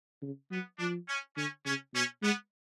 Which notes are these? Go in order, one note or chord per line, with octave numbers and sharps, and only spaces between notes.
C#3
F#3 B3
F3 D4
C#4
D3 C#4
C#3 C#4
B2 C#4
G#3 B3